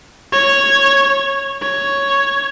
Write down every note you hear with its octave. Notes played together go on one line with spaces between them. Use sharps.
C#5
C#5